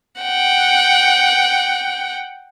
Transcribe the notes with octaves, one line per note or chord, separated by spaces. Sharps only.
F#5 G5